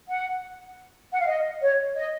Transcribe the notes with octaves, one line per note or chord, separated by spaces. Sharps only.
F#5
F#5
F5
D#5
C#5
D#5